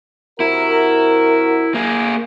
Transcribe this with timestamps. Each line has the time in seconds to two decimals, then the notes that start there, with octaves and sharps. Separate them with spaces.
0.40 C3 E4 F#4 A#4
1.74 A#3 G#4